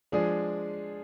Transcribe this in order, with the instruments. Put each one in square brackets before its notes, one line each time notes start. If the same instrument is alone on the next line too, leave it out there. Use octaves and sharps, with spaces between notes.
[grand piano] F3 G#3 D4 G#4